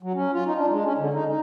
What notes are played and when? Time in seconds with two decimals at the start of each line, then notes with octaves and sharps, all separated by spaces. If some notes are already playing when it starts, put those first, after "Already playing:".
0.03 F#3
0.14 C#4
0.33 F4
0.46 D#4
0.57 D4
0.70 G#3
0.84 C#4
0.98 D3
1.14 D#4
1.27 D#4